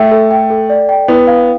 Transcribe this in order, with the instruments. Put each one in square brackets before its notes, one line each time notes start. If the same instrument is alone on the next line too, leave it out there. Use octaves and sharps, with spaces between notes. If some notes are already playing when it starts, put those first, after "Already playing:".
Already playing: [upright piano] A3 [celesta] G5
[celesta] A4
G5
A4
D5
G5
[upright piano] B3 [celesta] E4
[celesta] F5